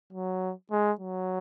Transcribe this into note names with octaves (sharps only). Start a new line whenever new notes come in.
F#3
G#3
F#3